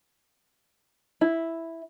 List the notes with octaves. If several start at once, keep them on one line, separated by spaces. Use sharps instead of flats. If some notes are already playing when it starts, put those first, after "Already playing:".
E4